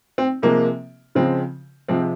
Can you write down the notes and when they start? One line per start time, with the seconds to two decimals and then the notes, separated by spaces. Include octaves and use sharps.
0.18 C4
0.42 C3 F3 G#3 A#3
1.15 C#3 F3 G#3 C4
1.88 C3 F3 G#3 C4